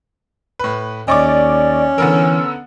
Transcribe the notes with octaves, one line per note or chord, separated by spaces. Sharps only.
A2 B4
D#2 C#4 D5 D#5 C#6 D6
D3 E3 B3 A#4 E6